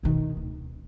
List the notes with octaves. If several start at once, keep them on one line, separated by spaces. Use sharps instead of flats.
B2 D#3
D1